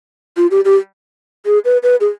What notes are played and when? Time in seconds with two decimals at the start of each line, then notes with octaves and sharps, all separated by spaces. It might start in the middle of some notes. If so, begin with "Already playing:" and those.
0.37 F4
0.51 G4
0.65 G4
1.46 G#4
1.65 B4
1.83 B4
2.01 G#4